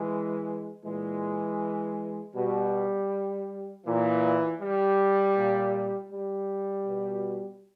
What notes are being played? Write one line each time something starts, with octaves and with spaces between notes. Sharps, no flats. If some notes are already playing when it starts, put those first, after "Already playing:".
Already playing: E3 G#3
A#2 E3 G#3
B2 G3
A#2 E3
G3
A#2
G3
B2